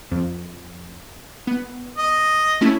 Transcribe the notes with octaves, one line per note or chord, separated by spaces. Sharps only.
F2
B3
D#5
A3 C#4 E4